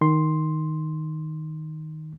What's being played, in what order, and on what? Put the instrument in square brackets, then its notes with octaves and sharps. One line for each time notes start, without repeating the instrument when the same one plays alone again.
[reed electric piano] D#3 C6